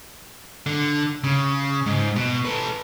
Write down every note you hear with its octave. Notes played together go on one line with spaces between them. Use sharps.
D3
C#3
G#2
B2
A4 B4